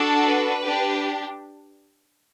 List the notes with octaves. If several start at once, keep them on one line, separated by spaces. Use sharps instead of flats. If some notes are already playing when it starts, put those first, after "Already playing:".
Already playing: D4 F#4 A4 A5
B4
D4 G4